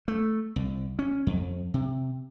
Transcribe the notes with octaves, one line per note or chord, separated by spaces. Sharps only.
A3
C2
C#4
F2
C3